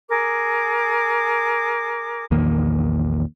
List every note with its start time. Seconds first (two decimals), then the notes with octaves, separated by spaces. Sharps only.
0.09 G#4 A#4 D6
2.31 A#1 E2 D#3 A#3